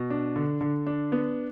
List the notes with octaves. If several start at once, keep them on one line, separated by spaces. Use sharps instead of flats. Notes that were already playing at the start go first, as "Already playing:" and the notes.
Already playing: B2
D4
D3
D3
D4
B3